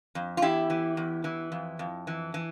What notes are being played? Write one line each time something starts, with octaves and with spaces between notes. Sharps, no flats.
F2
F4
E2 E4 G4
E3
E2
E3
F2
F2
E3
E3